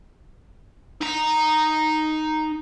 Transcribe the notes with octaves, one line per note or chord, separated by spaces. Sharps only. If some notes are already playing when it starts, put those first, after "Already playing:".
D#4 A#5